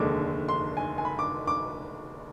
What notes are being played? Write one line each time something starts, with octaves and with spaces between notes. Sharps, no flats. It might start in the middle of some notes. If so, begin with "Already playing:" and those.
Already playing: F1 D#2 D3 G#3 D6
C6
G#5
G#5
B5
D6
D6